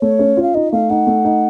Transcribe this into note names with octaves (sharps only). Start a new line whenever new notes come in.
A3 C#5
C#4
F4
F5
D#4 D#5
A3 F5
D#4 F#5
A3
D#4